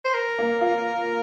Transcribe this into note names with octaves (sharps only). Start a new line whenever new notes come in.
C5
A#4
A#3
F4